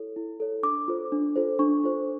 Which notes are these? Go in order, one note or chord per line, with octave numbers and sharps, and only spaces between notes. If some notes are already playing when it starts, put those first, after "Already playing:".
Already playing: E4 A4 C#5
E4
A4 C#5
D4 D6
F4 A4 C5
D4
F4 A4 C5
D4 C#6
F4 A4 C5